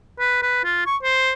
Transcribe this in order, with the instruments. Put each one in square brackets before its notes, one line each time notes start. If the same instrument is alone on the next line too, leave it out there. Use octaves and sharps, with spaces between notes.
[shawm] B4
B4
F4
C#6
C5